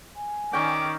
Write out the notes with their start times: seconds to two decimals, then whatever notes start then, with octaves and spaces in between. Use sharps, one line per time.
0.15 G#5
0.53 D#3 C#4 D5 G5 D6